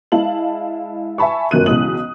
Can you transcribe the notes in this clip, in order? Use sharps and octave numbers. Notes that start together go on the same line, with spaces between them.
G#3 E4 F5 A5 F#7
E5 G#5 A5 B5 C#6
G1 F#2 D#3 F#6 D#7
B1 C#3 E3 G#3 D#6 F#7